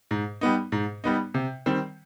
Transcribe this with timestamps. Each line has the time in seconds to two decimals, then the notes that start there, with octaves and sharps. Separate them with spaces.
0.11 G#2
0.41 G3 B3 D#4
0.72 G#2
1.04 G3 B3 D#4
1.34 C3
1.66 D#3 G3 C4